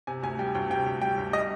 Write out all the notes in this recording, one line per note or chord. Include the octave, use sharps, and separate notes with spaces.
C3 G#5
D2 G#5
G3 G5
D2 G5
C3 G5
D2
G3 G5
D2
G3 D#5